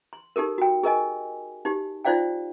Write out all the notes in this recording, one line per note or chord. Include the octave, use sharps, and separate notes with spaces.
C6
D#4 G4 A4 A#4
F#4 G5
G#4 A#4 D#5 G#5
D#4 G4
D#4 F4 C5 D5 F5 G5